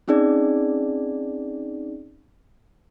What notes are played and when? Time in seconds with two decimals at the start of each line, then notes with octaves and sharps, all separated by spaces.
0.08 C4 C#4 D#4 G#4 D5